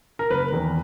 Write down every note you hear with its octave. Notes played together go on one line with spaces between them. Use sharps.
A#4
F#1 B4
E2 D#3